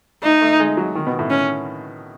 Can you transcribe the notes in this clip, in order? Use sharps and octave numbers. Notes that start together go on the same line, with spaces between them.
A3 D#4
A3
G#3
F#3
D#3
B2
A2
C#4